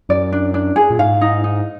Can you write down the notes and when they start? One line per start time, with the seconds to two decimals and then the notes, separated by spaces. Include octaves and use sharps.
0.09 F#2 D5
0.32 D4
0.54 D4
0.76 G#4
0.90 A#2
0.99 G#2 F5
1.21 D#4
1.44 D#4